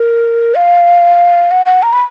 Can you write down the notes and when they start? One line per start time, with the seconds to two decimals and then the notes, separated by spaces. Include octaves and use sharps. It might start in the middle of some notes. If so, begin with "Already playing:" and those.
Already playing: A#4
0.55 F5
1.51 F#5
1.66 F#5
1.83 A#5
1.93 B5